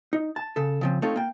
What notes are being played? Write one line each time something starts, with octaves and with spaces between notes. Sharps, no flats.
D#4
A5
C#3 A4
C#3 F3 C4
A3 C4 D#4 F4 A4 C#5
A#3 G5